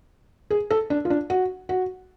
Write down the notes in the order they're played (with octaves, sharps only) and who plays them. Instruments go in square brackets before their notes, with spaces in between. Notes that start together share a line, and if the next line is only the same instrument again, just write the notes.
[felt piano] G#4
A4
D4
F4
D4
F#4
F#4